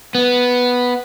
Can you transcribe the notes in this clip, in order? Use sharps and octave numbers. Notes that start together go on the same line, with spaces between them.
B3